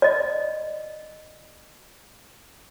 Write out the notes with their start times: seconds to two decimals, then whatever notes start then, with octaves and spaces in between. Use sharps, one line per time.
0.02 D5 D#5